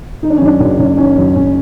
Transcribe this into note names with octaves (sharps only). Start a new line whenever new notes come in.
D#3 D#4
D4
C#4
F#2 D4
F#1
F#1
D#3 C#4
F#2
F#1 C#4